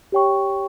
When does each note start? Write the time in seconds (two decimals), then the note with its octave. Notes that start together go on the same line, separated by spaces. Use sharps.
0.12 G4 C#5 G5 C#6